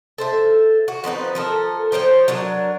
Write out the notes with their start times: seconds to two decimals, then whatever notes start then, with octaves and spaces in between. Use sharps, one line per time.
0.18 A4 C5 E5
0.88 F#4
1.04 F3 C4 D#4 B4
1.35 F3 A4 A#4
1.92 F3 C5 C#5 G5
2.28 F#3 D4 A#4